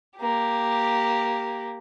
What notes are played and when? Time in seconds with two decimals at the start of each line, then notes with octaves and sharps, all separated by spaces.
0.17 A#3 G4